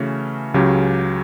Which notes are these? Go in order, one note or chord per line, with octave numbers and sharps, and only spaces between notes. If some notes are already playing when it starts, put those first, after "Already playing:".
Already playing: C#3 E3 A3 C#4 F#4
C#2 C#3 F#3 C#4 G4